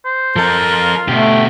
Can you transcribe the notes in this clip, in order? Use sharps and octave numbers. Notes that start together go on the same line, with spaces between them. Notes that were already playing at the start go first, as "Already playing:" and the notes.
C5
F3 A4 A#4
F4
B2 A3 G4